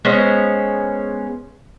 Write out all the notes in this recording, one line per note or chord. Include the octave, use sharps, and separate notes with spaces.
G#3 B3 C#4 C5